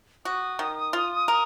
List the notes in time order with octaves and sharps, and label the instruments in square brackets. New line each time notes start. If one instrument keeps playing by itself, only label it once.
[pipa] F#4 [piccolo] D#6
[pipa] D#3
F4
A#4